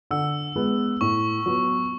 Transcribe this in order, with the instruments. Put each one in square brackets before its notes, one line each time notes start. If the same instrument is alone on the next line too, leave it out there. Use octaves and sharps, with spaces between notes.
[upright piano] D3 [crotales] E6
[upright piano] G#3 B3
[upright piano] A2 [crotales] C#6
[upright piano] F#3 B3